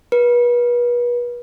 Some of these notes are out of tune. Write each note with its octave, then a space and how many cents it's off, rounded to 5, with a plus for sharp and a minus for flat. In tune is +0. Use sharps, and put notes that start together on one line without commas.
B4 -35